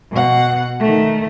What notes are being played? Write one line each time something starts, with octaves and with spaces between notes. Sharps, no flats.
B2 F#5
D#3 A3